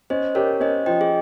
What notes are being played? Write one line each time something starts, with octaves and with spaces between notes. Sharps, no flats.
C#4 C5 D#5
G4 A#4 C#5
C#4 C5 D#5
F3 D#5 G5
G#4